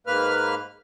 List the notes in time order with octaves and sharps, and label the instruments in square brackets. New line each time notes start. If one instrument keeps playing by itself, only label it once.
[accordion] G#2 A#3 B4 F6